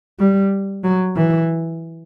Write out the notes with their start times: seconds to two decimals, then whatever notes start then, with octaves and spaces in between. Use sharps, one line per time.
0.19 G3
0.84 F#3
1.16 E3